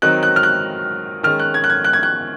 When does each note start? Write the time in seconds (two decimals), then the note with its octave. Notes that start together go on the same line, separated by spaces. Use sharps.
0.02 D#3 F#3 C4 D#4 F#6
0.23 F#6
0.36 F6
0.43 F#6
1.23 D#3 G#3 C#4 F6
1.40 F#6
1.54 G#6
1.64 F#6
1.70 G#6
1.85 F#6
1.93 G#6
2.03 F#6